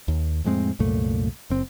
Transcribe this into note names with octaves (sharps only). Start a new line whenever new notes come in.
D#2
F2 A2 G#3 C4
C2 F#2 A#2 A3
F#1 C4